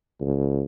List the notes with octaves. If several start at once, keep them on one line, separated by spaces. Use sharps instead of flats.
C#2